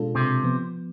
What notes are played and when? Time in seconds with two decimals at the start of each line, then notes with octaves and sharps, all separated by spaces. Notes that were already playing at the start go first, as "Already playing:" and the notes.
Already playing: B2 G#3 D4 F4 A4
0.15 C3
0.44 F3 B3